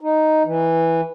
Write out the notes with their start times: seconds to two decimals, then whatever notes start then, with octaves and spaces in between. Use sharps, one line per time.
0.01 D#4
0.45 E3